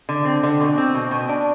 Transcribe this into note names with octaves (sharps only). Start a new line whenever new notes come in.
D3
C4
D3
B2
C4
B2
B2
D4